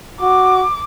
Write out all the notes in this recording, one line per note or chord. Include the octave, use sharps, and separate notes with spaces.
F#4 D6